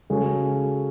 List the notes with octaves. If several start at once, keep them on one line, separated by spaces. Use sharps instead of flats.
C#3 G#3 C#4 F#4 A4